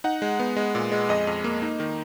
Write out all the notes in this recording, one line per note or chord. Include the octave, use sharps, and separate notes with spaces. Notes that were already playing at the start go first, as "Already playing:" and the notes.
D#4 F#5
G#3
B3
G#3
A#2
G#3
F2 D#5
F2
A#3
D#4
D#3